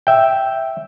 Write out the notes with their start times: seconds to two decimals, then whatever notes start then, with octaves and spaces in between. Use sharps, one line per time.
0.07 E5 G5